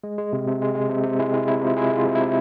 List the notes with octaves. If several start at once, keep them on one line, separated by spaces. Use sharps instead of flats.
G#3
G#3
C3
C3
G#3
G#3
C3
C3
G#3 E4
G#3 E4
C3 E4
C3 F4
G#3 E4 G#4
G#3
F4
C3
E4
C3